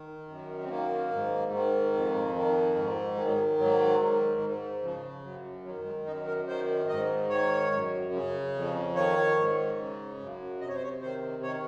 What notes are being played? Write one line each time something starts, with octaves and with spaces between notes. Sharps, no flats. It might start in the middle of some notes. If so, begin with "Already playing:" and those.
Already playing: D#3
F#2
C4
D#3 A#3
G#2
D#3
F2
D#3
G#2
D#3 G#3
F#3
G#3
G#2 F#3
D#3
G#2
C#3 F3
F#2 F#3
D#3 F#3
G#3
F#2 D#4
A#4
D#3 C5
G#2 D#5
D#3 C#5
F#2
C#3
F2
D#3 C#5
G#2
C#3
F#2
C3 D#5
C#5
C5
C#5
D#3 C5
D#3 C#5